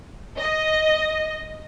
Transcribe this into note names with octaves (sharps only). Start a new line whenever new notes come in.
D#5